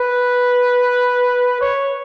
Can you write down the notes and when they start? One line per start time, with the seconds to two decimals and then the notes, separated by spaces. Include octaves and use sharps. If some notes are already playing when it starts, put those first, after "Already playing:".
Already playing: B4
1.61 C#5